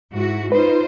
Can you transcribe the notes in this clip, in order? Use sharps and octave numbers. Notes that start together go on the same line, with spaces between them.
G#2 E4 F#4
D#4 F4 B4 C5